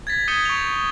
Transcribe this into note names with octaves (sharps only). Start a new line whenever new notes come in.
G#6 A6 B6
D#6 G6 G#6 C#7 D#7 G7
C#6 F7